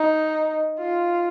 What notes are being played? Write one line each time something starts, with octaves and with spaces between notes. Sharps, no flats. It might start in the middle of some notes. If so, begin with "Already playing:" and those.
Already playing: D#4
F4